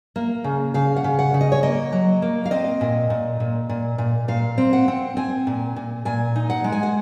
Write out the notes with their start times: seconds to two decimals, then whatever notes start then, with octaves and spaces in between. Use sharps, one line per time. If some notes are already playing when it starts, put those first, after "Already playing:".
0.16 A#3
0.44 C#3
0.74 C#3 F5
0.96 F#5
1.04 C#3
1.19 F#5
1.34 C#3
1.41 D#5
1.52 C#5
1.63 A#3 D#5
1.93 F#3
2.22 A#3
2.46 F5
2.51 C4 D#5
2.81 A#2
3.10 A#2
3.40 A#2
3.69 A#2
3.98 A#2
4.28 A#2 F5
4.58 C4
4.73 F#5
4.88 C4
5.17 C4 G#5
5.47 A#2
5.76 A#2
6.05 A#2 G#5
6.36 D#4
6.50 F#5
6.64 G#3
6.72 G#5
6.83 F#5